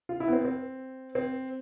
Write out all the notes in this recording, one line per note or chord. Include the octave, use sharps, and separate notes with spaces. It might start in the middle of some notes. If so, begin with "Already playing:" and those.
F4
E4
B3
C4
C4
C4